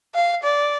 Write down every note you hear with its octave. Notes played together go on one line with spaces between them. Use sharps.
F5
D5